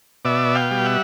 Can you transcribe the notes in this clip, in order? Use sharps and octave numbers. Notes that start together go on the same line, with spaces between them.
B2 D5 E5
F5 G5
G3
E5 F#5